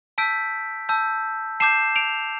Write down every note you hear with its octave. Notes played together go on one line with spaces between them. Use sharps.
A5 E6 G6 B6 D7
A5 E6 G6
A5 D6 G6 C7 E7
D7 F7